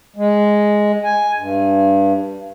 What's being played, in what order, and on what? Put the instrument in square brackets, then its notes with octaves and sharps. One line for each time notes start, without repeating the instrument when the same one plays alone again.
[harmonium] G#3
G#5
G2